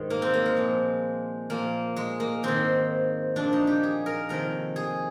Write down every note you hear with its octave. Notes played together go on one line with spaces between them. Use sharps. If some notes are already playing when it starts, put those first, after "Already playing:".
Already playing: G#2 D#3 D#4
A#3
C4
A#3
G#3
A#2 F3
A#2 F3 A#3
G#3
A#3
G#2 D#3 C4
A#2 F3 D4
D#4
G4
G#4
A#4
F2 C3 D#3 A#4
G#4